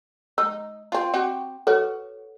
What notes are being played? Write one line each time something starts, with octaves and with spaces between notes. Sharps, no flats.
D#4 E6
C4 F4
C4 F#4 G4
F#4 A4 B4 C#5